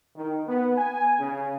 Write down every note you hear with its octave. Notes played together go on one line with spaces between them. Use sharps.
D#3
B3
G#5
C#3